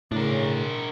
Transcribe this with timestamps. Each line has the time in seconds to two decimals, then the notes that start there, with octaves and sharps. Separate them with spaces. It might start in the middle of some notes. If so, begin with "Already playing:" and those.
0.12 A2 C#3 D4 A#4